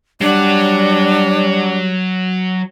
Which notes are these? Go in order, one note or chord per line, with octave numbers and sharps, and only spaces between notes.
F#3 G3 D4 F#5